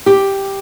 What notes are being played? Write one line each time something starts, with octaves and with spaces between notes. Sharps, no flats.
G4